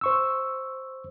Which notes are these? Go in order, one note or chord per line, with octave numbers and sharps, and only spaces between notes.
C5 C#6 E6